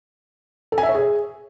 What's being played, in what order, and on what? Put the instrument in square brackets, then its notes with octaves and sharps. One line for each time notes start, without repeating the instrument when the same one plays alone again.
[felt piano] A4
G#5
E5
C#5
G#4